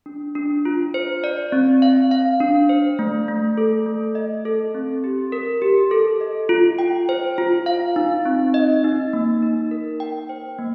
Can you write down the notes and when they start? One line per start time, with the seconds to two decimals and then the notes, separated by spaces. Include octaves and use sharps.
0.06 D4
0.35 D4
0.65 F4
0.94 C5
1.24 D5
1.52 C4
1.82 F5
2.11 F5
2.40 D4
2.69 C5
2.99 A3
3.28 A3
3.58 A4
3.86 A3
4.15 D#5
4.45 A4
4.75 C4
5.04 G4
5.32 A#4
5.62 G4
5.91 A4
6.21 D#5
6.49 F4
6.79 G5
7.09 C5
7.38 F4
7.66 F5
7.96 D#4
8.25 C4
8.54 D#5
8.84 D#4
9.13 A#3
9.42 D#4
9.71 A#4
10.00 G5
10.29 C5
10.59 A#3